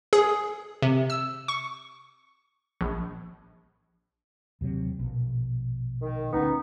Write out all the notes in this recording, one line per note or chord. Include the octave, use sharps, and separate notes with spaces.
G#4
C3
E6
C#6
A#1
D#2 C3 F#3
A#1 B2
D#3
D2 B3 C#4 D#4